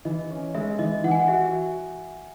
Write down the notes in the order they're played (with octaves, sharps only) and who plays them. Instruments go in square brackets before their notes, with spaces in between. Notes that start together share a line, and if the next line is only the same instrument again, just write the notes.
[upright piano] E3 [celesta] D#5
[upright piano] C#4
[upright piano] G#3 [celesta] E5
[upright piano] E3 [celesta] D#5
[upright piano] E3 [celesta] F#5
[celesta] G#5
F#5
[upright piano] F#4 [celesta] E5